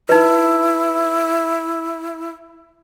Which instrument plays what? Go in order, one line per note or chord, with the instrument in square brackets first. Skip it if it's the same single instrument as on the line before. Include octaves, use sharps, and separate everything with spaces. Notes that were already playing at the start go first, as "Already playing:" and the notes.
[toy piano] D#4 B4 [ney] E4